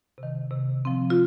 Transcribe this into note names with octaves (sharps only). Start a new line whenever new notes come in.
C3
D#3
C3
F3 C4
F4